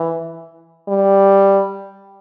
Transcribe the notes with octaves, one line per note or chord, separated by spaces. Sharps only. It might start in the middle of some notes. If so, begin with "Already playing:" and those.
Already playing: E3
G3